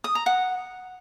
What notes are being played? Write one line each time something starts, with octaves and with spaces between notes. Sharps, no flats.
D#6
A#5
F#5